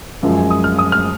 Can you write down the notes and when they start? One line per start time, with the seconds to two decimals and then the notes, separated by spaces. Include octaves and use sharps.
0.23 F#2 F3 G#3
0.37 G#5
0.50 D#6
0.64 F6
0.79 D#6
0.92 F6